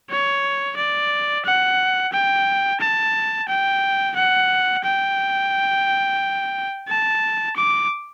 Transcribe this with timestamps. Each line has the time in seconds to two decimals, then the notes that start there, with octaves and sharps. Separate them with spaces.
0.10 C#5
0.77 D5
1.46 F#5
2.12 G5
2.81 A5
3.49 G5
4.16 F#5
4.85 G5
6.88 A5
7.57 D6